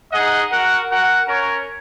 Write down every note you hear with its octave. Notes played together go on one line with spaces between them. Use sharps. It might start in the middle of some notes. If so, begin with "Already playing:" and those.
D#4 G#4 D#5 F#5
F#4 A#4 F#5
F#4 A#4 F#5
C#4 A#4 C#5